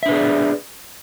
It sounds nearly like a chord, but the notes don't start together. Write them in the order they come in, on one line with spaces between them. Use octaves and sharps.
E5 D4 B4 G#4 D5